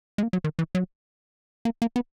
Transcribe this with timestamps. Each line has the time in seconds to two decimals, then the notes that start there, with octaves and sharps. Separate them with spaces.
0.18 G#3
0.23 A#3
0.33 F#3
0.44 D#3
0.59 E3
0.75 F#3
1.65 A#3
1.82 A#3
1.96 B3